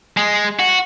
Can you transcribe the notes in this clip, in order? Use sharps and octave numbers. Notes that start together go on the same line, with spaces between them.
G#3
F#4